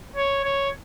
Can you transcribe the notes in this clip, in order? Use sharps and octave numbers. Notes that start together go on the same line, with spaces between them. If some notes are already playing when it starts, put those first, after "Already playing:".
C#5
C#5